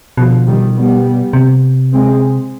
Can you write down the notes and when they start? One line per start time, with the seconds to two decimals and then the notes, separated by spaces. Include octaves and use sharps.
0.17 B2 D3 F3
0.46 D#3 G3
0.76 G3 B3
1.33 C3
1.93 G#3 C4